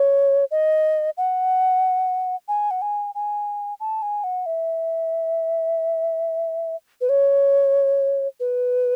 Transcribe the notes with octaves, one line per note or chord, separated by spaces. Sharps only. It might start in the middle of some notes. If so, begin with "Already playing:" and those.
Already playing: C#5
D#5
F#5
G#5
F#5
G#5
G#5
A5
G#5
F#5
E5
B4
C#5
B4